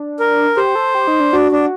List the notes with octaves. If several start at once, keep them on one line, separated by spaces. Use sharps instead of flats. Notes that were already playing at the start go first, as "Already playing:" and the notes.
Already playing: D4
A#4
G4 C5
A4
G4
D#4
D4
D4 F#4
D4